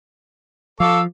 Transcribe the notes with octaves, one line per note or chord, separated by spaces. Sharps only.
F3 A4 F5 C#6 D6 E6